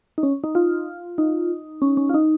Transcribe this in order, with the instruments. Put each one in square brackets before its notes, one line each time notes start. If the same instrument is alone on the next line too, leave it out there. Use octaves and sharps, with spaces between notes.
[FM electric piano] D#4
C#4
D#4
F4
D#4
C#4
C#4
F4
D#4